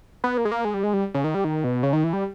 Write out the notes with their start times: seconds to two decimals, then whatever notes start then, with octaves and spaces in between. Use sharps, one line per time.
0.24 B3
0.38 A#3
0.45 G#3
0.51 A#3
0.65 G#3
0.74 G3
0.83 G#3
0.93 G3
1.14 C#3
1.24 D#3
1.34 G3
1.44 D#3
1.64 B2
1.83 C#3
1.93 D#3
2.04 E3
2.13 G3